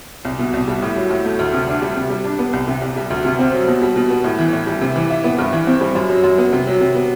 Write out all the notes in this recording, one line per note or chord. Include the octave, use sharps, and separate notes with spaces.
C2
B2
C2
G3
A2
F#3
A2
A3
D2
C3
D4
G3
C3
G3
D4
B3
C2
C3
C2
G3
D2
C3
C4
F#3
B2
G3
B2
B3
A2
E3
A2
G3
C3
E3
E4
B3
G2
E3
C4
G3
F#2
F#3
F#2
B3
C3
F#3
C3
B3